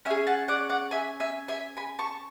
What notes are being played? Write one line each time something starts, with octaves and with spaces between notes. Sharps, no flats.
C#4 E5 G#5
G#4
F#5 A5
D5 F#5
D5 F#5
E5 G#5
E5 G#5
E5 G#5
G#5 B5
A5 C#6